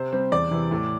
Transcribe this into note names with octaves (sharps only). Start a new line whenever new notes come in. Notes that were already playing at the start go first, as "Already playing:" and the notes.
Already playing: C3 C5
G3 C4
E2 D5
C3 E3
A2